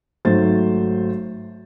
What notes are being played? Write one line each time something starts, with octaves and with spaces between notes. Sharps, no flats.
G#1 F#3 A3 C5 A6